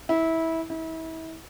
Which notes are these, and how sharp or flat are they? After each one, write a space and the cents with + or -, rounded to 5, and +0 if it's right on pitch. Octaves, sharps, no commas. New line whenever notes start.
E4 -20
E4 -35